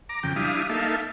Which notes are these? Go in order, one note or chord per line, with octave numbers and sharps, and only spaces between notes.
A#5 D6
F2 C#3 G5
G3 D4 E4 F5 D#6
A#3 D#4 A4 E5 F5